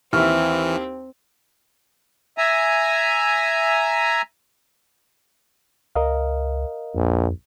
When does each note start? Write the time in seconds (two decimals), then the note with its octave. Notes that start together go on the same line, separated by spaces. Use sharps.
0.13 D#2 E3 C4 E4 C#6 F6
2.38 E5 G#5 A#5
5.95 C#2 A#4 D#5 F5
6.95 A#1 F2